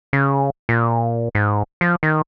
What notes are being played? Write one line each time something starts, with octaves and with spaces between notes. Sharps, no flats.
C#3
A#2
G#2
F3
D#3